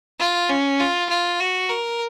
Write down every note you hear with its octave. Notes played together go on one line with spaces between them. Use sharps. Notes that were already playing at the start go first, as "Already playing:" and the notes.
F4
C#4
F4
F4
F#4
A#4